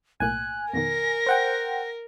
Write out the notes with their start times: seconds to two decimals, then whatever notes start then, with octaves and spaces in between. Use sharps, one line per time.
0.20 B1 A2 A#3 G#5 F#6
0.74 F2 B2 D#3 A#4 A#6
1.26 C5 F#5 G5